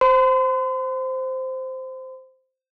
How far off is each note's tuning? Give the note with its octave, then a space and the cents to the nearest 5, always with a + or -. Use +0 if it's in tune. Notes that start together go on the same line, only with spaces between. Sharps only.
C5 -5 C6 -45